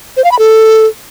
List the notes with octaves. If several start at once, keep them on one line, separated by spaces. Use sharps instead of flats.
C5
F5
B5
A4